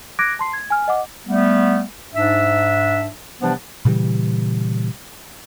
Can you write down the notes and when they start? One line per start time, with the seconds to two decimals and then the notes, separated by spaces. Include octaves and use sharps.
0.19 D6 F#6 G#6 A#6 D7
0.39 A5 C6 C7
0.53 G#6
0.70 G#5 F6
0.88 D#5 F#5 D6
1.26 G3 A3 B3
2.13 G#2 D4 E5
3.41 C3 E3 F3 G3 B3 D4
3.85 A#2 C#3 E3 G3